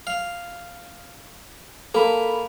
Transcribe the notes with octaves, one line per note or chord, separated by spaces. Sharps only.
F5
A#3 A4 B5